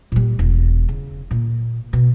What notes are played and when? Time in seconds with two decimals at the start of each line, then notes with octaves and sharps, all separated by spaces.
0.12 A#2 G3
0.39 E1
0.89 C#3
1.31 A#2
1.93 B2